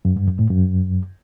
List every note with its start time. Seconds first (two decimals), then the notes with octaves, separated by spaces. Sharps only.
0.05 F#2
0.16 G2
0.28 F#2
0.39 A2
0.50 F#2